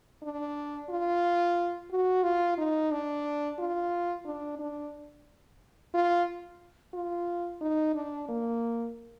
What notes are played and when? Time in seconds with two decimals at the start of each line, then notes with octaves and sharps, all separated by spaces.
0.23 D4
0.89 F4
1.91 F#4
2.23 F4
2.58 D#4
2.92 D4
3.59 F4
4.26 D4
4.59 D4
5.94 F4
6.94 F4
7.61 D#4
7.95 D4
8.29 A#3